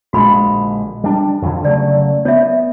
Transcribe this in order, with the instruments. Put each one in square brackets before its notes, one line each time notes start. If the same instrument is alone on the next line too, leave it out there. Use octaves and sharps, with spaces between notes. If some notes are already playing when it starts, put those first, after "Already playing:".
[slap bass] A#1 D3 G#3 [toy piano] F#4 B5
[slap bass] G3 D4
F2 D3
[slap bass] C#3 F#3 A3 [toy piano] D5
[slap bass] B3 [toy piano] C#5 E5